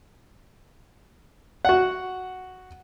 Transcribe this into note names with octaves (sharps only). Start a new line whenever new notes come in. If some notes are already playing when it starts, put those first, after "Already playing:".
F#4 F#5